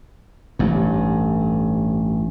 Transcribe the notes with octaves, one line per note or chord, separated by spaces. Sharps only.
A1 G2